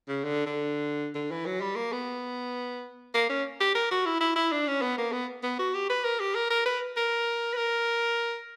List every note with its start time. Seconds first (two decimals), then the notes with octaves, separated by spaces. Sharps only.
0.08 C#3
0.24 D3
0.46 D3
1.15 D3
1.31 E3
1.46 F#3
1.61 G3
1.76 A#3
1.92 B3
3.14 A#3
3.30 C#4
3.61 G4
3.75 A#4
3.91 F#4
4.06 E4
4.21 E4
4.36 E4
4.52 D4
4.68 C#4
4.82 B3
4.98 A#3
5.12 B3
5.43 B3
5.59 F#4
5.74 G4
5.90 B4
6.04 A#4
6.20 G4
6.35 A#4
6.50 A#4
6.66 B4
6.97 A#4
7.53 B4
7.57 A#4